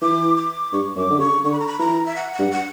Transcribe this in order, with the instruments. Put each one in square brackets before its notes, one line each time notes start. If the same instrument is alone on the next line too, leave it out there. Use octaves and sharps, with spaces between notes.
[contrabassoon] E3 [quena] D6
[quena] D6
[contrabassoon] G2 [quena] C#6
[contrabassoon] F#2 [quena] D6
[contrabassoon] D3
[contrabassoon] C#3 [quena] C#6
[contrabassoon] D3 [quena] C#6
[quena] B5
A#5
B5
[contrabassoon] E3 [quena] A#5
[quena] E5
F#5
F#5
[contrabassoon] G2
[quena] F#5